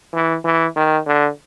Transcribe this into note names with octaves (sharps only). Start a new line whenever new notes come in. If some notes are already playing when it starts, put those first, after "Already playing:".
E3
E3
D#3
D3